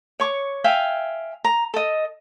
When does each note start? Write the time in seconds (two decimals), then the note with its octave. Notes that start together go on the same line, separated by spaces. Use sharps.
0.20 C#5 C#6 D6
0.64 E5 F5 G5 G#5
1.44 A#5
1.74 A4 D#5